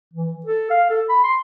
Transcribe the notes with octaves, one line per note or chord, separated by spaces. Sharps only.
E3
A4
F5
A4
B5
C6